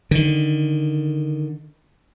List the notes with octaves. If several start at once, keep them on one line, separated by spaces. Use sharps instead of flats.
D3 D#3